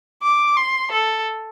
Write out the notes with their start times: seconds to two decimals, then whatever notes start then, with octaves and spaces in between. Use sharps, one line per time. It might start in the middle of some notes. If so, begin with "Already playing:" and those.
0.22 D6
0.57 C6
0.92 A4